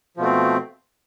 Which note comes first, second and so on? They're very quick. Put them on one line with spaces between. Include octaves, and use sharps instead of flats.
F3 B2 A3 C4